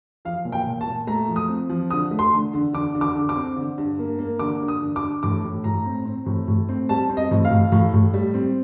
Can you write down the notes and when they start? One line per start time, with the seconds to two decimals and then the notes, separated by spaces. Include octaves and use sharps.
0.25 F3 F5
0.45 A#2
0.52 G5
0.67 A#2
0.81 A5
0.86 A#2
1.07 A3 A#5
1.28 F3
1.36 D#6
1.49 C4
1.70 F3
1.90 D3 D#6
2.11 A3
2.19 C6
2.33 D3
2.53 D3
2.73 D3 D6
2.95 D3
3.01 D6
3.15 D3
3.29 D6
3.36 C4
3.56 D3
3.78 G2
3.99 A#3
4.19 A#3
4.39 D3 D6
4.61 G2
4.68 D#6
4.81 D3
4.96 D6
5.02 G2
5.23 A2 D6
5.44 A2
5.64 A2 A#5
5.85 C4
6.06 C4
6.26 A2
6.48 A2
6.69 C4
6.89 G3 A5
7.09 C4
7.17 D#5
7.31 A2
7.45 F5
7.51 A2
7.72 A2
7.94 A2
8.14 G3
8.34 C4